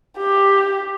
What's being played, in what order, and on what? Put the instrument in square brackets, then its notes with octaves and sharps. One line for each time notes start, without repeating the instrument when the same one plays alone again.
[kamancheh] G4